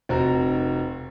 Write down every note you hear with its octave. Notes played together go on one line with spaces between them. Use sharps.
F1 C4 F#4 A#5